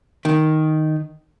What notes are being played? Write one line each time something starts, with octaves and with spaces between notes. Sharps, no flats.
D#3